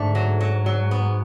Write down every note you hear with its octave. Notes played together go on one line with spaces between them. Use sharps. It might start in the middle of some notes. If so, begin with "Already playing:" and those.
Already playing: G#2 D3 A3
F#3
F#3
F#3
B3